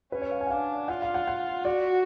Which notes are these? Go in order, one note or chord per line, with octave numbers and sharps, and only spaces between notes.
C#4 B4
C#5
F5
G#5
F#5
D4 F5
F4 F#5
F5
F#5
F#5
F#4 D5